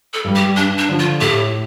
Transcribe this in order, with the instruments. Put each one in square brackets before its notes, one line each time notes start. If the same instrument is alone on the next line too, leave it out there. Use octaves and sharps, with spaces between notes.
[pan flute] A4
[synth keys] G2 G3
[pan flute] G4
[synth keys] G2 [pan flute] D4
[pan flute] D4
[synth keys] D3 F3
[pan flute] F4
[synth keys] A2 [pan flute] G4